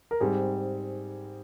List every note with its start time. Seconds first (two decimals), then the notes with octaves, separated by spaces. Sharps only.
0.11 A#4
0.20 G#2 G3 C4 G#4